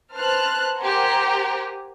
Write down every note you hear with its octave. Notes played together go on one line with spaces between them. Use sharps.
B4 C5 A5 F6 F#6
G4 A#4 C5 F#5 G#5 A#5